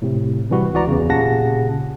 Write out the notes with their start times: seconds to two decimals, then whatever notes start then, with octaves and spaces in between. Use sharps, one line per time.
0.02 A2 C3
0.50 C3 E3 G3 F#4 B4
0.73 C#2 E3 F#4 D5 A#5
0.88 E2 C#3
1.09 A#2 C#3 G4 F#5 A5 A#6